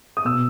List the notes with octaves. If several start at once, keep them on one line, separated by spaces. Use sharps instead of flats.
D#6
B2 E6